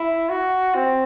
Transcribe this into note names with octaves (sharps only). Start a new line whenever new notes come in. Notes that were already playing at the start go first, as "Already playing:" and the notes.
Already playing: E4
F#4
C4